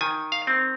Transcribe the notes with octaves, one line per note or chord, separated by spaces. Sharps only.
D#3 G#5
F5
C4